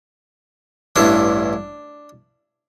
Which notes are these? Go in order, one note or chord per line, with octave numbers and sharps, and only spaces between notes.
A1 G2 E3 D4